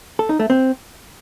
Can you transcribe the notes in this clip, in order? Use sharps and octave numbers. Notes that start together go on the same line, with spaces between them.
A4
D#4
A3
C4